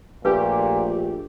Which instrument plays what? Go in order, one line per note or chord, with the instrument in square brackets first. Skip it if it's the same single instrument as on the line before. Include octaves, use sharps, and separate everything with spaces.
[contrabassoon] A#1 [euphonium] A#2 [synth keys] A3 G4 [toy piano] B4